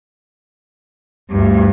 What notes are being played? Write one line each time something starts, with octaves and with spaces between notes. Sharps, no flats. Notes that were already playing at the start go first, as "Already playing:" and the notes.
D2 G2